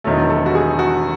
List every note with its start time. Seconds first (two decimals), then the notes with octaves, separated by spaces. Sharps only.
0.04 E1 E2 D#3 F#3 A3
0.30 A4
0.46 F#4
0.55 G#4
0.79 F#4